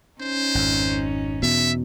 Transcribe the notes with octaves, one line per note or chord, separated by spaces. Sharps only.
C#4 D#4 C5
G#1 F2
E2 B2 E5